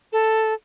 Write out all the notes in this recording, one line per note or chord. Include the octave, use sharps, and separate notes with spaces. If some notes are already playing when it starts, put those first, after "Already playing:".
A4